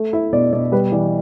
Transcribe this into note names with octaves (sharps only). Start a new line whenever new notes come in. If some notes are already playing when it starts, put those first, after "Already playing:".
Already playing: A3
E4 E5
B2 D5
B2 D5
G3 B4
E3 D5